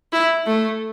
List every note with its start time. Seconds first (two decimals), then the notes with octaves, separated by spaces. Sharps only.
0.13 E4
0.46 A3